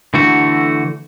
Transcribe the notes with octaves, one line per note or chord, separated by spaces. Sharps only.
D3 E3 A3 F#4